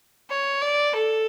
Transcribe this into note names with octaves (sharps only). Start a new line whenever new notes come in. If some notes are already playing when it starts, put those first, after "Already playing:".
C#5
D5
A4